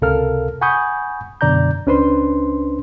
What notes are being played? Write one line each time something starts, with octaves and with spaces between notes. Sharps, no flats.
C#2 C3 A4 A#4 F5 F6
F#5 G#5 B5 C#6 D#6 G6
F#2 B2 D3 D5 A#5 G6
C#2 C#4 D4 B4 C5 C6